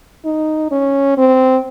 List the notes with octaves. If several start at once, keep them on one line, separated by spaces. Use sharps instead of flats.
D#4
C#4
C4